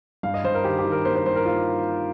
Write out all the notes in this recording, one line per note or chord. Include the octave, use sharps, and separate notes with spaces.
G2 F5
D#5
G2 C5
A#4
D#3 G4
G4
D#3
A#4
A#3 C5
C5
G2 C5
A#4
A#3 F4